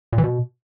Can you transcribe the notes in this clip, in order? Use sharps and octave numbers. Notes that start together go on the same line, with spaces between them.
A#2
E3
B2